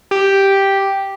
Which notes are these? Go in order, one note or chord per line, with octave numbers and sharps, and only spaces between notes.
G4